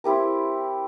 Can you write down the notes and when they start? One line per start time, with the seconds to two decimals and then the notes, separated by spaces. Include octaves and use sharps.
0.04 C4 E4 G4 A#4